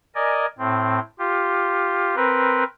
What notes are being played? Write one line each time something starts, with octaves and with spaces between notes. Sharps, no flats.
A#4 D5 D#5 G#5
A2 C4
F4 G4
C4 A#4 B4